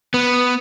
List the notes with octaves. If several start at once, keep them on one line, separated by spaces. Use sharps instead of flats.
B3